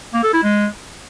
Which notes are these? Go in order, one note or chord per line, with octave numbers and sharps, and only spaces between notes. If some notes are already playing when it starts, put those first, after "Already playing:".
A#3
A4
E4
G#3